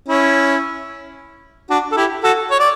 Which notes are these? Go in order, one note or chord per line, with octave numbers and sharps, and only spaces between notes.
C#4 E4
D4 F#4
A4
E4 G4
F#4 A4
C#5
D5